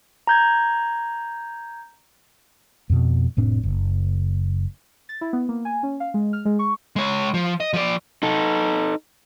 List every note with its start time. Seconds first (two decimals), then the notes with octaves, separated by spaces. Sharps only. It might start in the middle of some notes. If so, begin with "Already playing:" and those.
0.27 A#5 G6 G#6
2.90 F2 B2
3.37 F1 A2 C4 D4
3.63 F#1
5.09 A6
5.21 E4
5.33 B3
5.49 A#3
5.65 G#5
5.83 C#4
6.00 F5
6.14 G#3
6.33 F6
6.45 G#3
6.59 C#6
6.96 G#3 C#5
7.34 F3
7.60 D#5
7.73 F3 D5
8.23 D#4 A4